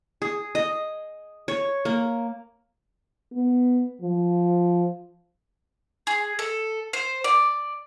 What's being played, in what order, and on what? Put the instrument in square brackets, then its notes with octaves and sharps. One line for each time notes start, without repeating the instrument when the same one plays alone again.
[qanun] G#4
D#5
C#5
A#3
[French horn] B3
F3
[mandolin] G#4
A4
C5
D5